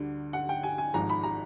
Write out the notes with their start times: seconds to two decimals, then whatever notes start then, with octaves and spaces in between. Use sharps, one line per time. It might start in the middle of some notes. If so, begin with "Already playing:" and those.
Already playing: D2 D3 G3
0.33 F#5
0.49 G5
0.63 G#5
0.78 G#5
0.94 G#1 G#2 F3 G#3 A#5
1.09 B5
1.23 A#5